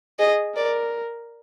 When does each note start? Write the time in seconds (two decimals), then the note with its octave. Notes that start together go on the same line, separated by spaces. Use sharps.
0.19 G#4 D#5
0.56 A#4 D5